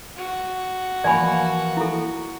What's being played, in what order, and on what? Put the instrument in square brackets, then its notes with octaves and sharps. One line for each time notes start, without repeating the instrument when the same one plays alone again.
[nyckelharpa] F#4
[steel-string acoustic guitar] E3 F3 A#3 [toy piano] D5 G#5 B5
[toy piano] E4 A4